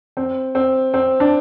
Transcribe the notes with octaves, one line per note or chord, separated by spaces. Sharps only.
C4
C4
C4
D4